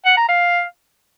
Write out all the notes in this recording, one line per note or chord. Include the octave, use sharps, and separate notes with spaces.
F#5
A#5
F5